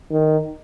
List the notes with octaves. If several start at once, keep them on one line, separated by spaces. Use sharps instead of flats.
D#3